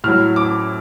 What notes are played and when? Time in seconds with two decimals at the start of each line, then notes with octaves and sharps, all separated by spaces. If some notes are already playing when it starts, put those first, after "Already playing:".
0.04 A2 F#3 F6
0.36 D6